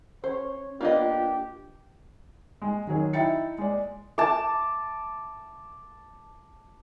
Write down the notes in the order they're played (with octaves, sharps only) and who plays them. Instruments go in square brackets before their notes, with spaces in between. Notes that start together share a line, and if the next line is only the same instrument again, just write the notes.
[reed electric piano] C#4 [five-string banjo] C5 [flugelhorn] C#5
[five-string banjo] A#3 B3 D#5 [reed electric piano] D4 F4 [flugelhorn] G4
[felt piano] G#3
D#3 F#3 G#4 C#5
D#4 E4 G5 A6 C#7
G#3 D5
[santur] A5 D6